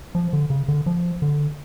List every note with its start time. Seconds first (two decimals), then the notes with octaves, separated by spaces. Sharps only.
0.15 F3
0.33 D3
0.50 C#3
0.68 D3
0.86 F3
1.22 D3